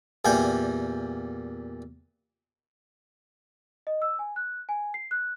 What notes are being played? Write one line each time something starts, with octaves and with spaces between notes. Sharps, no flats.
E2 A#2 G3 G5 G#5
D#5
E6
G#5
F#6
G#5
C7
F#6